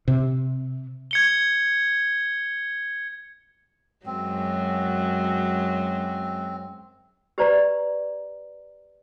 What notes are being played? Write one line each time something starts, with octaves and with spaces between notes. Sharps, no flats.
C3
G#6 C#7 G7
F#2 F#3 G#3 C4
G4 B4 C5 D5 A#5